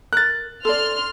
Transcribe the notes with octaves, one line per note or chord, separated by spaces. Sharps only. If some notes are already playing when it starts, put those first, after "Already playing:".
A#4 F#6 A6
A4 D5 C6 F6